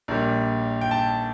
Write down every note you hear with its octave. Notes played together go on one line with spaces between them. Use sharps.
A#1 A#2 G3
G5
A5